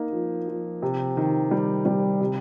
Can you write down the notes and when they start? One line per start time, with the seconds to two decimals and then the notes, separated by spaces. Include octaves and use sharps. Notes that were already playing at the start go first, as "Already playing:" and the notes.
Already playing: A#3 D#4
0.12 F3
0.48 F3
0.82 C3
1.17 D#3
1.51 G3
1.85 G3
2.21 C3